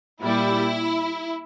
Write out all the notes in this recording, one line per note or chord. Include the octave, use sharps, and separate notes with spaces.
A#2 G3 E4